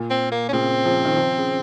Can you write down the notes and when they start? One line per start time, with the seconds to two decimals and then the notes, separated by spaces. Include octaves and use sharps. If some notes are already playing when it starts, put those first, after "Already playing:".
Already playing: A#2
0.10 C4
0.32 A#3
0.49 C#4
0.53 A#2 C#3 C4
0.85 C#3 F3
1.05 D#3
1.16 C#3 F3
1.38 C#3